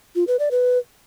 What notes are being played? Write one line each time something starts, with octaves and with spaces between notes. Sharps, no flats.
F4
B4
D5
B4